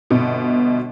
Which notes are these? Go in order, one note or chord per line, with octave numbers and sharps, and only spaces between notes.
G1 B2